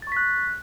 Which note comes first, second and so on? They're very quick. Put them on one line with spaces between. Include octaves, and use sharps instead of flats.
A6 C#6 B6 F#6